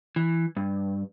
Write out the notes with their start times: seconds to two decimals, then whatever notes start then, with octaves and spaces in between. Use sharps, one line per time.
0.16 E3
0.57 G2